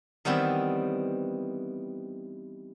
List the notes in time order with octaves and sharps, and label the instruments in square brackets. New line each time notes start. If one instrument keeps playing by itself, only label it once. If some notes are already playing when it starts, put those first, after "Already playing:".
[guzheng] D#3 E3 G3 B3 C4 E4